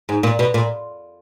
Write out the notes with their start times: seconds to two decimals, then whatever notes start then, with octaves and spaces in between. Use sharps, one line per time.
0.09 G#2
0.23 A#2
0.39 B2
0.54 A#2